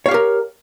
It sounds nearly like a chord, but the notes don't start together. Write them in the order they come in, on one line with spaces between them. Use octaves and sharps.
C#5 F5 G4 A#4